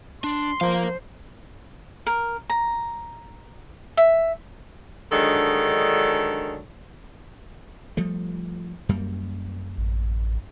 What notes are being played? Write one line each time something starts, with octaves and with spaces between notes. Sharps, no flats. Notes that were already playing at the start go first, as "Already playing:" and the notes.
D4 C6
F3 A#4 C5 F5
A#4
A#5
E5
D3 D#3 F#3 G#3 D4 A4
F3 G3 A3
F#2 G3 A#3
A1